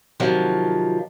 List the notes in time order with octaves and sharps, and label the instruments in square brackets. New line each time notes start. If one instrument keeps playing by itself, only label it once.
[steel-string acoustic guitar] C3 D#3 F3 F#3